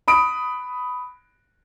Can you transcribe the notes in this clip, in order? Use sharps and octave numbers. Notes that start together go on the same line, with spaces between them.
B5 D#6 D7